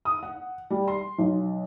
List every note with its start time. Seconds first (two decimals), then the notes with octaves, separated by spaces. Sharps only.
0.05 D#6
0.23 F#5
0.70 G3
0.88 C6
1.18 B1